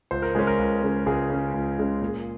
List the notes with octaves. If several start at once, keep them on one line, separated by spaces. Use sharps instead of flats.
C#2 C5
A#4
C#3 G#3 C#4 G#4
A#4
C#2
C#3 G#3 C#4
C#2 G#4
C#3 G#3 C#4
C#2
C#3 G#3 C#4
A#2